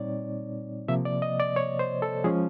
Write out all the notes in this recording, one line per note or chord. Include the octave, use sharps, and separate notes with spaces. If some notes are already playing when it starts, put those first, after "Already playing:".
Already playing: A#2 G3 C4 D#4 C#5 D5
C3 F3 A#3 E5
D5
D#5
D5
C#5
C5
A4
F3 G#3 C#4 G#4